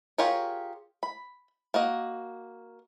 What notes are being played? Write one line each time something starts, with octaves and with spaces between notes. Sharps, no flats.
F4 G4 G#4 A#4 C#5
B5
A#3 F#4 D#5